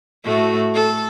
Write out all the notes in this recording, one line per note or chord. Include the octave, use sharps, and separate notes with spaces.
A2 A3 F#4
A4